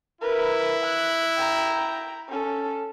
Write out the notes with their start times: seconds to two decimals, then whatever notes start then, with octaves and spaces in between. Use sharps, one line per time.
0.21 E4 A#4 B4
0.84 F#6
1.37 G5 A#5
2.29 C#4 A4